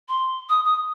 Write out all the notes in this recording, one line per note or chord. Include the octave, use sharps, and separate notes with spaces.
C6
D#6
D#6